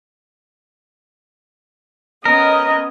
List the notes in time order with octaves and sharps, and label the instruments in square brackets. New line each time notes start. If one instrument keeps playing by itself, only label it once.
[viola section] B3 C#4 D#5 [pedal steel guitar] A#4